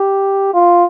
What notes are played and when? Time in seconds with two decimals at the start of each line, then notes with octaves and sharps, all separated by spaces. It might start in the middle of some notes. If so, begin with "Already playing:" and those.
Already playing: G4
0.53 F4